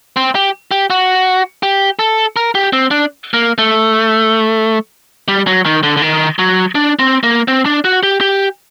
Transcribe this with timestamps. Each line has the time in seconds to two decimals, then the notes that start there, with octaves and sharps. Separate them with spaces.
0.17 C4
0.35 G4
0.71 G4
0.90 F#4
1.63 G4
1.99 A4
2.36 A#4
2.55 G4
2.73 C4
2.91 D4
3.34 A#3
3.58 A3
5.28 G3
5.47 F#3
5.65 D#3
5.83 D3
5.97 D3
6.02 D#3
6.39 F#3
6.75 D4
6.99 C4
7.23 A#3
7.48 C4
7.66 D4
7.85 F#4
8.03 G4
8.21 G4